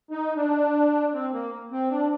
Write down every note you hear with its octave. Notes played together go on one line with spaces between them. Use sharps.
D#4
D4
C4
A#3
C4
D4